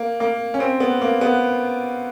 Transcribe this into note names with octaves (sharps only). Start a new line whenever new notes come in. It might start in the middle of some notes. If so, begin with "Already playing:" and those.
Already playing: A#3
A#3
C#4
C4
B3
A#3
B3